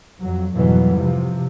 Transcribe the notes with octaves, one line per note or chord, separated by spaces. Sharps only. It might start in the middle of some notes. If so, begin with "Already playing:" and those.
F2 F#3
F2 G#2 B2 E3 F#3 G3
C3 F3